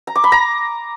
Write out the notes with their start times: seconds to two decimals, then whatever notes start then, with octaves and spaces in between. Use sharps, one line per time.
0.07 A#5
0.15 D6
0.24 B5
0.32 A#5